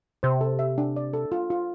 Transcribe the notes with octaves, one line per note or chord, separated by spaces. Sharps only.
C3 C5
A4
E5
D4
D5
A4
F4
F4